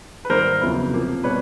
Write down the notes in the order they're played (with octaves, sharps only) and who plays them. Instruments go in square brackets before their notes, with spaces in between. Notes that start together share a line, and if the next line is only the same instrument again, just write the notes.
[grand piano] B4
G#2 D#3 G3 A#3 A#4 C5
F2 C#3 F#3 B3 E4
C3 F3 A#3
B2 G3 B4 C#5